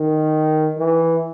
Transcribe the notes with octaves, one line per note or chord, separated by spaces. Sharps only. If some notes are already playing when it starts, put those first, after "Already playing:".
Already playing: D#3
E3